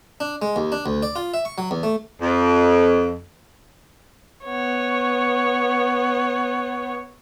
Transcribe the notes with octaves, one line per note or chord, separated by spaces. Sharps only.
D4
G#3
D#2
D4
D2
D5
F4
E5
C#6
F#3
E2
A3
F2
B3 C#5